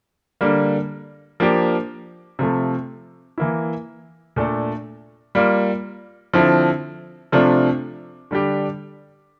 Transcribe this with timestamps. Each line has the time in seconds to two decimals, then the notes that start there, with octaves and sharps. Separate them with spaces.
0.41 D3 G3 A#3
1.40 F3 A#3 D4 G4
2.39 C3 F3 A3
3.38 E3 A#3 E4
4.36 A#2 A3 D4 A4
5.35 G3 A#3 F4
6.34 D3 F3 C4 E4 A4
7.32 C3 F3 A3 D4 F4
8.31 D3 G3 D4 G4